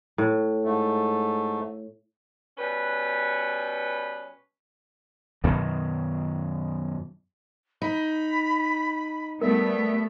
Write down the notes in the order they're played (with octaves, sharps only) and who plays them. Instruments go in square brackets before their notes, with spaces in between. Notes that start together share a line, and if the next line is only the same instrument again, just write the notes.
[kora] A2
[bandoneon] G#2 A3
[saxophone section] B2 G3 C#4 B4
[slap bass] F#2 B2 D#3 F#3
[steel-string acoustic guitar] D#4 [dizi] B5
[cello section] G3 A3 B3 [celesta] A#4 [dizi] E5